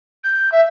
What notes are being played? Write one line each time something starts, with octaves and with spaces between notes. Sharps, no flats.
G6
E5